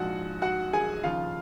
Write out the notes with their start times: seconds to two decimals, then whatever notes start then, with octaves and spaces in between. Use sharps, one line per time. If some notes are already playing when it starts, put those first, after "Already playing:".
Already playing: A#1 G#2 F3 F#4 F#5
0.42 F#4 F#5
0.73 G#4 G#5
1.03 D#2 C#3 F3 F4 F5